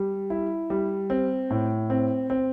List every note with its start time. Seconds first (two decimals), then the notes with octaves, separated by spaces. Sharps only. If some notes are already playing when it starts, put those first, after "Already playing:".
Already playing: G3
0.30 E4
0.70 G3
1.10 C4
1.50 A2
1.90 C4
2.30 C4